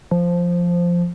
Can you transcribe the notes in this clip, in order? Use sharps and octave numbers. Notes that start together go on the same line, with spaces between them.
F3